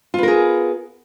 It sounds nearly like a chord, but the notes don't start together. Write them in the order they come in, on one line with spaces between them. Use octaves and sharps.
F4 B3 A#4 G#4